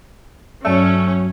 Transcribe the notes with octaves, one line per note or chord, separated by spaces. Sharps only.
G2 F#3 A3 C#4 D5